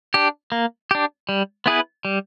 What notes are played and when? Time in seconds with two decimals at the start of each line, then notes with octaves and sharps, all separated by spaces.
0.14 D4 G4
0.52 A#3
0.91 D4 G4
1.29 G3
1.66 B3 E4 G#4 B4
2.05 G3